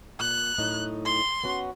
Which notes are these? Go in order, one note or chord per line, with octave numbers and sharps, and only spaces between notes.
A#2 F#6
F#2 A2 D#4
C6
B3 C#4 F#4